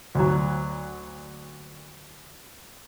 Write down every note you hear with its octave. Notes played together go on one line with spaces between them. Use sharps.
D2 F#3